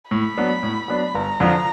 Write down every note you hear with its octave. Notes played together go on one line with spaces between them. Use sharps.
A2 B5
F#3 B3 D4
A2
F#3 B3 D4
G1 A#5
F2 D3 F3